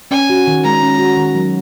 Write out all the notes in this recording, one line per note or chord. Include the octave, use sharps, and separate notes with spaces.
C#4 G#5
F#4
D#3
G#3 A#5
C#4
F#4
D#3
F#3